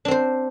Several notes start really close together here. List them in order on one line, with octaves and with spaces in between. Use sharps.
D4 C4 C5